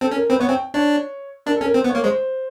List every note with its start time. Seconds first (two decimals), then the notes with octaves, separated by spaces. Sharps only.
0.01 C4 A4
0.11 C#4
0.15 A#4
0.30 C4 B4
0.39 B3 C#5
0.49 C4 G5
0.74 D4 C#5
1.46 D4 A#4
1.56 A4
1.61 C#4
1.65 A#4
1.74 C4 C5
1.84 B3
1.90 C#5
1.95 A#3
2.03 G#3 C5